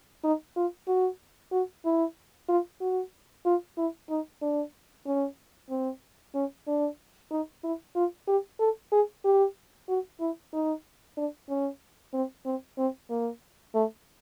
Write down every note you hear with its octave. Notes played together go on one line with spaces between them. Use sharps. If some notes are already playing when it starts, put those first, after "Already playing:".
D#4
F4
F#4
F#4
E4
F4
F#4
F4
E4
D#4
D4
C#4
C4
C#4
D4
D#4
E4
F4
G4
A4
G#4
G4
F#4
E4
D#4
D4
C#4
C4
C4
C4
A#3
A3